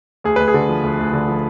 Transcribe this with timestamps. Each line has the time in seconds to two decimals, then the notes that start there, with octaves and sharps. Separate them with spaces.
0.24 D2 G#4
0.36 D2 B4
0.48 G#4
0.54 D3
0.69 F3
0.83 D2
0.99 D2
1.13 D3
1.28 F3